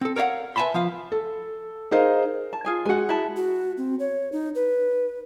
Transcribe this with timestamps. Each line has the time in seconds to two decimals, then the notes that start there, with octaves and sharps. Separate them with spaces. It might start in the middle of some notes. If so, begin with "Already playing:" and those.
0.01 C4 A4
0.16 A#4 C#5 D5 F5 F#5
0.56 B4 E5 G#5 A5 B5 C6
0.74 F3 F4 F5
1.12 A4
1.91 D#4 G#4 A#4 C5 D#5 F5
2.53 A5
2.65 F4 G#4 G#5
2.85 G#3 F#4 F#5 G#5
3.09 E4 A5
3.36 F#4
3.77 C4
3.99 C#5
4.32 D#4
4.55 B4